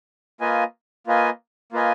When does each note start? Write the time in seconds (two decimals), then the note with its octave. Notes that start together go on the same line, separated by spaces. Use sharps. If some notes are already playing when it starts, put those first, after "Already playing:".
0.41 A#3 F4 B4 D#5 G#5
1.07 A#3 F4 B4 D#5 G#5
1.72 A#3 F4 B4 D#5 G#5